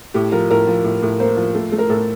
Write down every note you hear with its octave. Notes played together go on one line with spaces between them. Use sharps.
A2 G4
F3 A#4
A2 A#4
F3
A2
A2
A#3 C5
F3
A3
A3
A#4
A2 A4